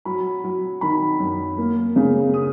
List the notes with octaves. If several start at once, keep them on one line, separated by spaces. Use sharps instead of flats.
F#3 B5
F#3
D#3 B5
F#2
A#3
C#3
D#6